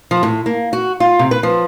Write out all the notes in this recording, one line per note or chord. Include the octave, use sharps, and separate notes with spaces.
F3
A2
A#3
F#4
F4
C3
B4
F3